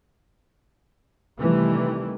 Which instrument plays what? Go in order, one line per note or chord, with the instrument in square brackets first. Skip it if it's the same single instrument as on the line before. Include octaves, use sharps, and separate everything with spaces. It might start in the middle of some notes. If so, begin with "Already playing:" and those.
[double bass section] C3 D#3 E3 G3 A3